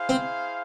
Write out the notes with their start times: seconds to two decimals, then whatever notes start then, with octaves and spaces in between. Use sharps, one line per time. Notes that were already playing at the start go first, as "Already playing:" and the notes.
Already playing: E4 G#4 C5 F5
0.09 C4